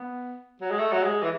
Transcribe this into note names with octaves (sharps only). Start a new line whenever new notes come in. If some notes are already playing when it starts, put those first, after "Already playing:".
Already playing: B3
F#3
G#3
A3
F#3
G#3
E3